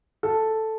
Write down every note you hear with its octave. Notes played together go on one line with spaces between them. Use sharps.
A4